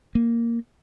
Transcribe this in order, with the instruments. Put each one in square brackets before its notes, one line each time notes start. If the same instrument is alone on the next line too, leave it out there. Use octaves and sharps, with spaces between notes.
[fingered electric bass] A#3